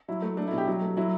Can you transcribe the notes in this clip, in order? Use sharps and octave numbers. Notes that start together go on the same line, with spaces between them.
F#3 E4
A3
A3 D4
E4
B2
G4
F#3
A3
F#3 E4